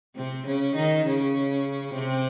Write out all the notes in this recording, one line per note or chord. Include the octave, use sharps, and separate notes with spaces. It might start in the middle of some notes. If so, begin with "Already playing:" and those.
C3 C4
C#3 C#4
D#3 D#4
C#3 C#4
C3 C4